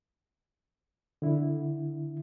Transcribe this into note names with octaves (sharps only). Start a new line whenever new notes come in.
D3 E4